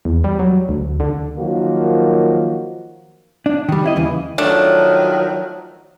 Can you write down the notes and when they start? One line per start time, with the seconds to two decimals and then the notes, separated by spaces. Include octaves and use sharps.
0.05 E2
0.24 G3
0.39 F#3
0.69 D2
1.00 D3
1.38 D#3 F3 F#3 A#3 F#4
3.46 D4
3.69 D#3 G3
3.84 C4 E4 D#5
3.96 D#2 C#3 E3
4.38 D#3 F3 F#3 A3 D4